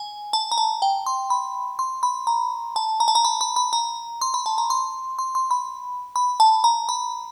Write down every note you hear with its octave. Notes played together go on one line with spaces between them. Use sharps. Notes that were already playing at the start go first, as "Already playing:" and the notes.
Already playing: G#5
A5
A#5
A5
G5
C6
B5
C6
B5
A#5
A5
A#5
A5
A#5
B5
B5
B5
A#5
C6
B5
A5
A#5
C6
C6
C6
B5
B5
A5
A#5
B5